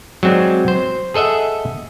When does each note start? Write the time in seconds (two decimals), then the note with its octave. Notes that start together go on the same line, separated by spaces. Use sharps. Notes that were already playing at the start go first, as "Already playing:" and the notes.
0.23 F#3 G#3 C4 D#4 D5
0.68 C5
1.14 G#4 A4 D#5 E5 F#5